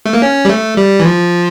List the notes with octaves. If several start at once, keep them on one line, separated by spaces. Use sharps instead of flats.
A3
A#3
C#4
G3
A3
G3
E3
F3